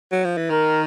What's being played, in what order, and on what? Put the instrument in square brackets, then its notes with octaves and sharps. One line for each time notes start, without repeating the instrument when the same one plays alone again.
[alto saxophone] F#3
F3
E3
[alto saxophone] D#3 [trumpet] A#4